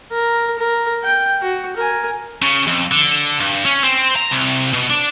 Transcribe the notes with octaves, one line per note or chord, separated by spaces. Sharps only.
A#4
A#4
G5
F#4
A#4 G#5
C#3
F2
D3
G2
C#4
C4
A#5
C2
B2
D4